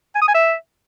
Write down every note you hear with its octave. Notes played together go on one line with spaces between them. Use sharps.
G#5
D#6
G#5
E5